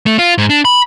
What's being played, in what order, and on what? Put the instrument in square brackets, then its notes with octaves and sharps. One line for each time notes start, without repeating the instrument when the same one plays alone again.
[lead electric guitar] A3
F4
G#2
D4
B5